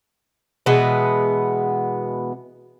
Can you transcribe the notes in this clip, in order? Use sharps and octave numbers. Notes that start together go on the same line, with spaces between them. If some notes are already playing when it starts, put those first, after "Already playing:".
B2 E3 G#3 B3